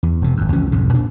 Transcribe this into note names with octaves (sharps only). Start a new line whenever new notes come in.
E2
E1 C3
G#1 F#2
C#2 E3 F3 C#4
B1 F2 G#2 C#3
A#2 D4